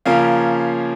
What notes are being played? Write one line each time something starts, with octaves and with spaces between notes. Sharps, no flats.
C#3 F3 A#3 C#4 F5